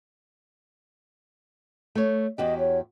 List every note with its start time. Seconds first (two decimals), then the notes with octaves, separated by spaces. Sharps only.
1.95 A3 C#5
2.38 E2 F#4 G4 D#5
2.59 C#5